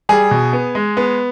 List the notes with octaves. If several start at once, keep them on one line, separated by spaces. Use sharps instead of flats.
G3 G#4
B2
B3
G#3
B3